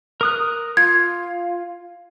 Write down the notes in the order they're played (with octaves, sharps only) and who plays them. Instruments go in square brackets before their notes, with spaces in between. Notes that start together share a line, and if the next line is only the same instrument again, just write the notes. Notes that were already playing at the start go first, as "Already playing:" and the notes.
[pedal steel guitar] A#4 D#6 F#6
[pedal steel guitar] F4 [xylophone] G#6